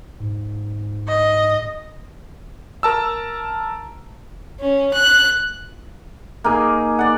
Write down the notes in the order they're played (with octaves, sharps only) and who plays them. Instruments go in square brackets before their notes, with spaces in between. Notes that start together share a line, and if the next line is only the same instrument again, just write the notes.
[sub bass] G#2
[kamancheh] D#5
[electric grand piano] A#4 A5 E6
[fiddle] C#4
F#6
[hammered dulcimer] A#3 D#4 G#4
D5 F#5